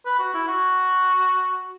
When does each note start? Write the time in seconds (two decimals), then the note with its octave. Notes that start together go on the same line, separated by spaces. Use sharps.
0.06 B4
0.19 F#4
0.34 E4
0.47 F#4